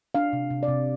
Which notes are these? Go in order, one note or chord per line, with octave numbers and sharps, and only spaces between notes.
D4 F5
C3
C3
D5
C3